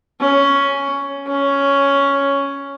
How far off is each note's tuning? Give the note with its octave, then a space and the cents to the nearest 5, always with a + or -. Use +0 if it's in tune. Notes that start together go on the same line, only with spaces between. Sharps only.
C#4 +10
C#4 +5